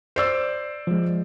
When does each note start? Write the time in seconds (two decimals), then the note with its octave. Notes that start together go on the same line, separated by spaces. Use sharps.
0.16 C5 D5 E6
0.87 F3 G#3